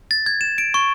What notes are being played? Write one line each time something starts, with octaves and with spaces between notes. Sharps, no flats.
A6
G#6
E7
D7
C#6